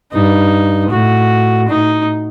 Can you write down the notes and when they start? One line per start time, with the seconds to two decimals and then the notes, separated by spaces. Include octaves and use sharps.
0.13 G2 D#4
0.90 A2 F#4
1.68 A2 D#4